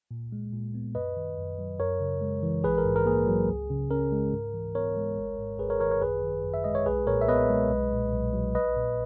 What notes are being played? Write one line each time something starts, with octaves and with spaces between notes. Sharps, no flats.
A#2
G#3
A#2
B3
F#2 B4 D#5
D#3
F#2
F#3
F#2 A#4 C#5
C#3
G#3
E3
A#1 G#4 B4
A#4
G#2
A#4
A#3 G#4
F#3
C#2
C#3
C#4 A#4
G#3
G#2
E3
B3 A#4 C#5
G#3
G#1
G#2
G#1 G#4 B4
A#4 C#5
D#3 A#4 C#5
A#4 C#5
F#2 G#4 B4
D#3
F#2
E5
G#3 D#5
C#5
B1 G#4 B4
A#2 A#4 C#5
E5
B3 B4 D#5
G#3
B1
A#2
B1
F#3
A#1 B4 D#5
A#2